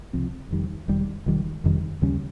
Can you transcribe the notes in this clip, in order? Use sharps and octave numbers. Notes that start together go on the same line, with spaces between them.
C#2 C3 F3 C4
F1 F2 D#3 G3
F1 F2 D#3 G3
F1 F2 D#3 G3
F1 F2 D#3 G3
D#2 C#3 G3 C#4